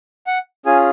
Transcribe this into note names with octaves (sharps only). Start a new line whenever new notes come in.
F#5
C#4 F4 G#4 G#5